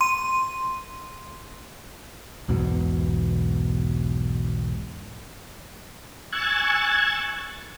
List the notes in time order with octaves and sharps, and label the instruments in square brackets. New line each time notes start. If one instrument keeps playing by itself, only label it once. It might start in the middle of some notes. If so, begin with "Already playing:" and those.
[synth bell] C6 D#7
[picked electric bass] B1 E2 G#2 B2
[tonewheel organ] G#5 C#6 E6 F#6 G#6 A6